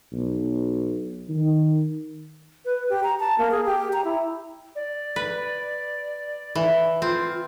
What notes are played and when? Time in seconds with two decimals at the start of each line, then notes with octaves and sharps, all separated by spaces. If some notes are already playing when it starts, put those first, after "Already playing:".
0.12 B1
1.29 D#3
2.65 B4
2.89 G4
3.03 A#5
3.20 A5
3.38 A#3
3.51 G#4
3.66 G4
3.93 A#5
4.05 E4
4.76 D5
5.16 B4
6.55 E3
7.02 C4 F4